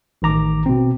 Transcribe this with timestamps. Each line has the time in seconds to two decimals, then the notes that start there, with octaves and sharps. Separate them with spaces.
0.22 A1 D#3 A#5 D6
0.66 B2 C4